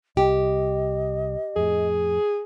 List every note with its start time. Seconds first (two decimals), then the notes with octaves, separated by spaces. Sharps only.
0.17 C2 G4 D#5
1.56 F2 A2 G#4